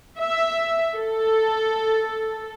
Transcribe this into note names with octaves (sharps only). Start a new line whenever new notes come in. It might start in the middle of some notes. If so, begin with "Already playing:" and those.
E5
A4